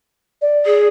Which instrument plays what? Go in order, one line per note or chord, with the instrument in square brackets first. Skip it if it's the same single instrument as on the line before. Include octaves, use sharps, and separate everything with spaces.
[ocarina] D5
[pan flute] G#4